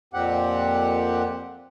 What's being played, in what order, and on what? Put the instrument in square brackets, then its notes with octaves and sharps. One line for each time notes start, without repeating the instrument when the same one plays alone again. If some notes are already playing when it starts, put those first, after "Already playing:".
[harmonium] F2 A#2 C4 G4 F#5